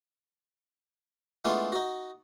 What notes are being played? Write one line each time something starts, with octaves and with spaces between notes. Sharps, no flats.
E3 G#3 A3 B3 D4 F4
D#4 F#4